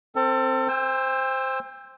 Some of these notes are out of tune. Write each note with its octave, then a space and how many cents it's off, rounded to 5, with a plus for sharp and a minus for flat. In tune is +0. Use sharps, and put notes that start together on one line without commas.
C4 +0 A4 +30
C5 +0 G5 +40 E6 +0